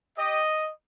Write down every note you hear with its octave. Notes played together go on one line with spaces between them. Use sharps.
G4 D#5